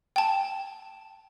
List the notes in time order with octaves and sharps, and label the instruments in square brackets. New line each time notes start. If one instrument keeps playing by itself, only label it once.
[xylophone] G5 A5